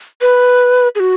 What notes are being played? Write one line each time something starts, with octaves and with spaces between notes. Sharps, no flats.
B4
G#4
F#4